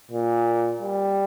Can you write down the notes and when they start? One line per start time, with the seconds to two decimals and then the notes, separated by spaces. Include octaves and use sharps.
0.11 A#2
0.81 G3